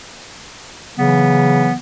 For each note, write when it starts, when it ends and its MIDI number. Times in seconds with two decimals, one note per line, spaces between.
0.98 1.73 49
0.98 1.73 52
0.98 1.73 54
0.98 1.73 59